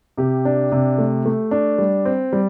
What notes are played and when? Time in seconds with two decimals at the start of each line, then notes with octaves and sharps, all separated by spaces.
0.18 C3 G4
0.45 D4
0.72 C3
0.98 A3
1.25 A3
1.51 D4
1.78 G3
2.05 C4
2.32 G3